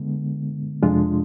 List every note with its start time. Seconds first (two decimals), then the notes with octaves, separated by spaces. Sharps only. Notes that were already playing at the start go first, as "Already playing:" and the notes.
Already playing: D3 G#3 B3
0.83 F2 C3 G#3 D4 F4